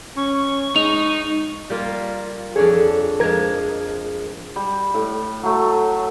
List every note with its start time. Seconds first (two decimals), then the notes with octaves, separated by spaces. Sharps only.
0.17 C#4 C#6
0.76 G#3 D#4 F7
1.70 G3 A#3 F4
2.56 F2 D4 G#4 A4 C#5
3.20 F3 G#3 A#4 G#6
4.56 G3
4.94 A2
5.43 F#3 A3